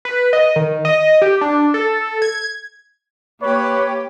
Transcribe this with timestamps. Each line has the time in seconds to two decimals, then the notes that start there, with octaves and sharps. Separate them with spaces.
0.05 B4
0.33 D#5
0.56 D#3
0.85 D#5
1.22 G4
1.41 D4
1.74 A4
2.22 G#6
3.41 A#3 G4 B4 C#5